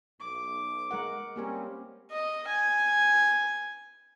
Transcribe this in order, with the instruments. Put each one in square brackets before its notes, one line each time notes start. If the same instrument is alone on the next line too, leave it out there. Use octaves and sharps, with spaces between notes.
[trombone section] B1 [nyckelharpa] D6
[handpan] G#3 A#4 F#5
[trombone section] G3 C4 C#4 [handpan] A#3 G4 A#4
[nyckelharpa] D#5
G#5